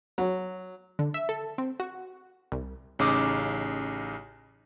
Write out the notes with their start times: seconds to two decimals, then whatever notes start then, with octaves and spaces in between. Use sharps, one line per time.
0.18 F#3
0.99 D3
1.14 E5
1.29 A4
1.58 C4
1.80 F#4
2.52 C2
2.99 A1 C#3 D#4 D6 D#6